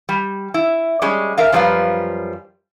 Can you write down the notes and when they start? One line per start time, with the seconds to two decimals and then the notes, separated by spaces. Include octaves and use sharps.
0.09 G3
0.54 E4
1.02 G3 G#3 C#4
1.38 A#4 E5 F5
1.52 F#2 F3 G3 F4 B4 F5